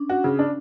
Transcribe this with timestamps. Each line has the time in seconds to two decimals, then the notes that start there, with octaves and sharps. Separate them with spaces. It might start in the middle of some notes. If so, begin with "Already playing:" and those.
Already playing: C#4 D4
0.09 F#4
0.24 C#3
0.39 D4